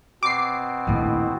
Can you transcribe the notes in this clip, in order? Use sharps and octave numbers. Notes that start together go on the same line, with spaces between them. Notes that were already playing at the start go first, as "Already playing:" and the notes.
B2 C4 D6 C7
A#1 D#2 A2 D#3